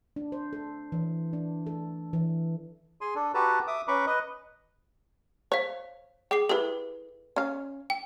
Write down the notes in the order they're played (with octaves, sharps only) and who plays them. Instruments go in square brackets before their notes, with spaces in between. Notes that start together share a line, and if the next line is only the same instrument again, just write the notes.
[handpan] D4
C5
A4
E3
D4
A4
E3
[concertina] G#4 G#5 C6
D4 A4
F#4 G4 A4 B4 A5 A#5
E5 D6 D#6
C#4 B4 A#5 B5 C#6 D6
B4 D#5
[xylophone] C5 F5 [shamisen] C#5
[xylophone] G#4 D6 C7 [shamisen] G5
[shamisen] E4 G4 [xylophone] A4 B4
[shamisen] C#4 F5
[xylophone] G5